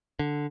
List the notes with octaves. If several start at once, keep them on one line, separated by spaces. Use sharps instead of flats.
D3